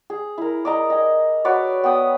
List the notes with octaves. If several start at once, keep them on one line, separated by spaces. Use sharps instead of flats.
G#4
E4 A#4
D5 D#5 A#5
D#5 G#5
F#4 B4 C#5 D5
B3 G5 D#6